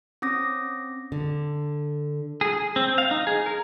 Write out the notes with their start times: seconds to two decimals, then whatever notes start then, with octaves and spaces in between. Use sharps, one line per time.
0.22 C4 C#4 D6 D#6 A#6
1.12 D3
2.41 G#4
2.76 C4
2.98 F5
3.11 D#4
3.27 G#4
3.46 A#4